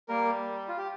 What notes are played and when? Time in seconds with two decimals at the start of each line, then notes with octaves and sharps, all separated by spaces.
0.08 G3 A#3 A#4
0.68 F4
0.77 G4